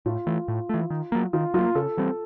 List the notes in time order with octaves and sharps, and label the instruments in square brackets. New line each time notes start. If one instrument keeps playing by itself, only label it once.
[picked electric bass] A2 [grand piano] F4
[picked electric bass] E3 A3
A2
E3 A3
D#3
F#3 A#3
[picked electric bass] D#3 [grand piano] F4
[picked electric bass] F#3 A#3 [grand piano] F4
[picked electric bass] C#3 [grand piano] A4
[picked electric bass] E3 G3 C4